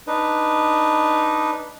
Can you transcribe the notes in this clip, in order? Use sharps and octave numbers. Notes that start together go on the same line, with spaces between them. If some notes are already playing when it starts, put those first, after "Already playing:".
D4 D#4 B4